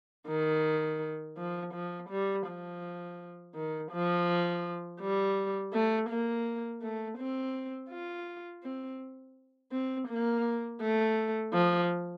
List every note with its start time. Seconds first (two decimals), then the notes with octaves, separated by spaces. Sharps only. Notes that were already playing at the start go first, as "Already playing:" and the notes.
0.28 D#3
1.37 F3
1.74 F3
2.10 G3
2.46 F3
3.55 D#3
3.91 F3
5.00 G3
5.73 A3
6.10 A#3
6.82 A3
7.18 C4
7.90 F4
8.64 C4
9.72 C4
10.08 A#3
10.81 A3
11.53 F3